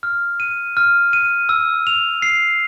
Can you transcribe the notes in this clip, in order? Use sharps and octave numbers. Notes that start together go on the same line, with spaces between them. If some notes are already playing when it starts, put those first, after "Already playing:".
F6
D#7
F6
D#7
E6
F7
C7